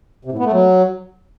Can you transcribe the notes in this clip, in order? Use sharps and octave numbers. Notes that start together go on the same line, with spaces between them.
C3
A2
B3
A3
F#3